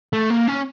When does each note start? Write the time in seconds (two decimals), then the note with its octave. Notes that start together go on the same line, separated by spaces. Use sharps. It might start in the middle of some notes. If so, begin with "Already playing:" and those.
0.13 A3
0.30 A#3
0.48 C#4